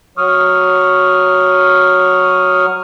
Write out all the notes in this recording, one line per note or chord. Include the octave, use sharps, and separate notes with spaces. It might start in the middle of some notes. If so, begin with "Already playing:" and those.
F#3 C#6 D#6 F6